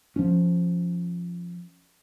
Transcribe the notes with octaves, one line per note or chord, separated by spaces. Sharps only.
F3 C#4